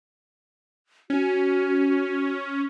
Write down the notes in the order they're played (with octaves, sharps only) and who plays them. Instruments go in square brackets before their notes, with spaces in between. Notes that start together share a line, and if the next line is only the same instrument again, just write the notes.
[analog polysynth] C#4 [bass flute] F#4